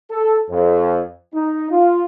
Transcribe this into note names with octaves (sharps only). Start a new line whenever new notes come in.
A4
F2
D#4
F4